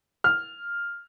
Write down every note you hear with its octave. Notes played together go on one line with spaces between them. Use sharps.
F6